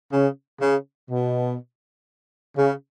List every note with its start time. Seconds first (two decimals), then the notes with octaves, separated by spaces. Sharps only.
0.13 C#3
0.61 C#3
1.11 B2
2.57 C#3